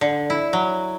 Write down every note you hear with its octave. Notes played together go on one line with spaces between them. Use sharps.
D3
E4
F#3